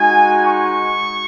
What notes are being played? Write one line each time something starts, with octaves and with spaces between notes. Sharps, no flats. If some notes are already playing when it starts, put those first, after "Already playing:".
Already playing: G#3 D#4 F#4 G#5
C#6